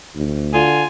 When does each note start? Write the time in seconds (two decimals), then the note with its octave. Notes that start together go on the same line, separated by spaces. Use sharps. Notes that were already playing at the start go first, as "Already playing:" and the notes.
0.16 D2
0.53 D3 F4 G#5